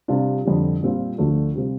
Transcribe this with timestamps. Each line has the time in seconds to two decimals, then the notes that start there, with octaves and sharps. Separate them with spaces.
0.08 C3 G3 D4 F4
0.45 F2 D3 G3
0.83 A#2 G3 C4 F4
1.18 D2 D3 F3 A3
1.55 C3 G3 C4 F4